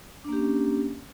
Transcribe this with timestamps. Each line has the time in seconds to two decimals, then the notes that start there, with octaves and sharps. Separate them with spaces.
0.24 D4
0.29 A#3
0.33 G4
0.37 C#4